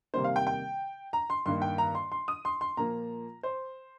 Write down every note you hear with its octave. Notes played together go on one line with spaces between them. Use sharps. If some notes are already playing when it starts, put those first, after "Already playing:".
C3 D#3 G3 A#3 C5
F5
G5
G5
A#5
C6
G2 D#3 A#3 C6
G5
A#5
C6
C6
D#6
C6
C6
A#2 F3 A#3 A#5
C5